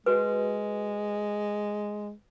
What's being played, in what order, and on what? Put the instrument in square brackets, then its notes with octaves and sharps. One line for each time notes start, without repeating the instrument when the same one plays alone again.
[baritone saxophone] G#3 [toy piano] F#4 B4